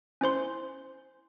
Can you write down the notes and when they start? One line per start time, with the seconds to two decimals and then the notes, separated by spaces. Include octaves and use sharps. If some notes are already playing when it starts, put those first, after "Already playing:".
0.21 C#4 E4 C5 C6